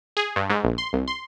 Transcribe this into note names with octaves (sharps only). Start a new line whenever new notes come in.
G#4
G2
G#2
A#1
C6
C2
C6